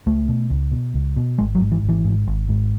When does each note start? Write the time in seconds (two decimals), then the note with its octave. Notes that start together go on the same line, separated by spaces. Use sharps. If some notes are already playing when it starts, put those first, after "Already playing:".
0.06 C#2 A3
0.28 B2
0.50 C#2
0.72 B2
0.94 C#2
1.16 B2
1.38 G#1 G#3
1.55 F#3
1.61 G#2
1.72 E3
1.83 G#1
1.89 E3
2.05 G#2
2.27 G#1
2.49 G#2